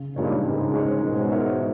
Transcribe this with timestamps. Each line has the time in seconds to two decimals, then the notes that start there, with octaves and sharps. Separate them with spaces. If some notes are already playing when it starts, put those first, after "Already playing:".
Already playing: C#3
0.16 G2 A#2 G#3 D#4 A#4 C#5
0.45 G#2 C#3
0.73 G#3 D#4 A#4 C#5
1.01 G#2 B2 G#3
1.31 D#4 A#4 C#5 E5